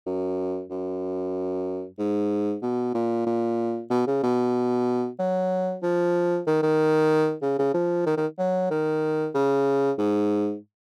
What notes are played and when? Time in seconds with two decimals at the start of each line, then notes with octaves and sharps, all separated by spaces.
0.07 F#2
0.71 F#2
1.99 G#2
2.62 B2
2.94 A#2
3.26 A#2
3.90 B2
4.07 C#3
4.23 B2
5.19 F#3
5.83 F3
6.47 D#3
6.63 D#3
7.42 C#3
7.59 C#3
7.74 F3
8.06 D#3
8.17 D#3
8.39 F#3
8.71 D#3
9.34 C#3
9.98 G#2